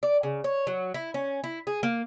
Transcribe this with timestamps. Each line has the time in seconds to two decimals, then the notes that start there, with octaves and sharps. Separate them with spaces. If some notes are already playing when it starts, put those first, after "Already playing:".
0.03 D5
0.23 C#3
0.44 C#5
0.67 F#3
0.94 E4
1.14 C#4
1.44 E4
1.67 G#4
1.83 A#3